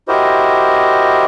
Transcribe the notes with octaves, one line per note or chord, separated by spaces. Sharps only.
E4 F#4 G4 A#4 C5 D#5